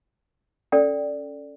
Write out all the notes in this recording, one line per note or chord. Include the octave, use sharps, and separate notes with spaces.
C#4 A4 D5 G5